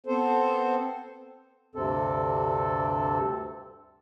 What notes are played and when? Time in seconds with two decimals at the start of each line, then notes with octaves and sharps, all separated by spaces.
0.07 B3 C4 A4 C5
1.75 D2 G2 C3 C4 A4